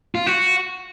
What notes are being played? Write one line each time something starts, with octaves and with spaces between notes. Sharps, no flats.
F4
F#4